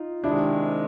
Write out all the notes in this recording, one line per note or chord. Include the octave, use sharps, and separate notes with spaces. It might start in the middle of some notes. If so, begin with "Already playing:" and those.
Already playing: D#4 F4
C3 D#3 G#3 D4 E4